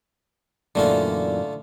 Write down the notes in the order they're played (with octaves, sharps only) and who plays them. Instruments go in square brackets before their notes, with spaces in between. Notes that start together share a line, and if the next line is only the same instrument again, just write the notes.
[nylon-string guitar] F#2 A#2 E3 [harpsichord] D3 A3 F4